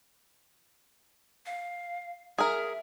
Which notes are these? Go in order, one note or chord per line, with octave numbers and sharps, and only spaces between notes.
F5
G#4 A#4 E5